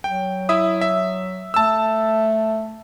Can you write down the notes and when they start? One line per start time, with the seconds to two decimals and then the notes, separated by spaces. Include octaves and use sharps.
0.04 F#3 G5
0.49 E4 E5 D#6
0.81 E5
1.54 A3 A5 E6